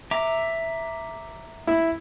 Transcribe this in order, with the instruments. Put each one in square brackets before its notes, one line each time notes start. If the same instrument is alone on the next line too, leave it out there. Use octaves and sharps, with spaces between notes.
[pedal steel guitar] E5 A#5 D6
[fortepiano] E4